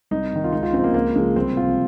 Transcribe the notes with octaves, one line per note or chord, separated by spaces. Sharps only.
C2 D#4
C3 D#3
F4
C#2 D#4
F4
C#3 F3 C4
A#3
C#2 A#3
C#3 F3 G#3
C2 C4
C3 F3 F4